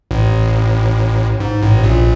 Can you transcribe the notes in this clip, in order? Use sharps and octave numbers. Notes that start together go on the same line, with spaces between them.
A1 A2
G#2
A1 A2
A#1 A#2